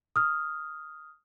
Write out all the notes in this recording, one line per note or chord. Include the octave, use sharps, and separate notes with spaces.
D#6 F6